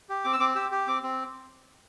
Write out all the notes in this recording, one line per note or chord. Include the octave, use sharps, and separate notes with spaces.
G4
C4 D6
E6
C4 D6
G4 E6
G4
C4 D6
C4